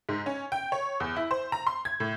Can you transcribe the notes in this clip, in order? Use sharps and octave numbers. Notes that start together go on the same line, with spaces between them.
G#2
C#4
G5
C#5
E2
E4
C5
A#5
C6
G#6
A2